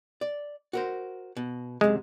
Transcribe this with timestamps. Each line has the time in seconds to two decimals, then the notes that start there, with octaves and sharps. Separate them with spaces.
0.21 D5
0.73 F#4 A#4 C5
1.37 B2
1.81 F#2 C3 G#3